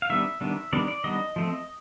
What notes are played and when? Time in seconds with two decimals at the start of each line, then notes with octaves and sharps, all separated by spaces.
0.02 F5
0.10 D#3 G3 B3 D4 E5
0.41 D#3 G3 B3 D4
0.73 D#3 G3 B3 D4 D5
0.88 D5
1.04 D#3 G3 B3 D4 D#5
1.36 F3 A3 C4